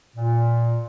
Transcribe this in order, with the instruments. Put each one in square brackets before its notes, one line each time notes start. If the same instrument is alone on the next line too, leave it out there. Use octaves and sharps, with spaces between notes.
[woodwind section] A#2